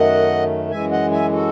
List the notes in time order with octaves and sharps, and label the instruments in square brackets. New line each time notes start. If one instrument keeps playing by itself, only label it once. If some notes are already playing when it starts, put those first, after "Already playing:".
Already playing: [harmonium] F#2 D#3 A3 D#5 F#5
F#2 E3 G#3 E5 G#5
D#5 F#5
E5 G#5
F#4 A4